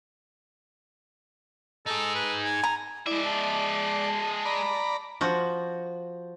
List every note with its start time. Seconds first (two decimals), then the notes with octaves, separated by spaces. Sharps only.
1.86 D#4 G#4 A4
2.15 B4
2.44 G#5
2.63 A#5
3.06 G#3 E4 D5 E5
3.24 A5
4.45 D5 A#5 B5
5.21 F3 F#4